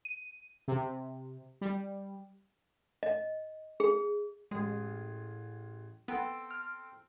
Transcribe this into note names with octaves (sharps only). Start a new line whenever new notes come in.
D#7
C3
G3
D#5
G#4
A1 G#3 G#4
B3 C4 A4 G5
F6